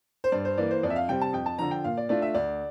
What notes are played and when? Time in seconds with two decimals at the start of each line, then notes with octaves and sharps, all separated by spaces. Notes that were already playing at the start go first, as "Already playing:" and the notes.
0.24 C5
0.32 G2 D5
0.45 C5
0.58 E3 A#3 D5
0.71 C5
0.83 F2 D5
0.90 E5
0.96 F5
1.08 C3 G3 C4 G5
1.21 A5
1.33 F2 G5
1.46 A5
1.59 D3 F3 A#5
1.71 G5
1.84 A#2 F5
1.97 D5
2.09 A3 D4 F4 D5
2.22 E5
2.35 D2 D5